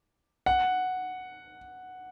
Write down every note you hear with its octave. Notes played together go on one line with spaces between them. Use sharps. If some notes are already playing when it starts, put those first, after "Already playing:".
F#5